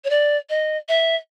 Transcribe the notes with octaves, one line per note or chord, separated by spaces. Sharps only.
C#5
D5
D#5
E5